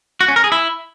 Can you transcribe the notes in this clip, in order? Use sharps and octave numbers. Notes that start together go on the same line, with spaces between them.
F#4
C#4
A#4
G#4
E4